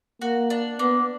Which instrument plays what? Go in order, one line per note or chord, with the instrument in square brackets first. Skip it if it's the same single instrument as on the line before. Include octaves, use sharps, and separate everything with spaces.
[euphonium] A#3 [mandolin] F#4
[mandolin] D4
[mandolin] A#3 [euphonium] B3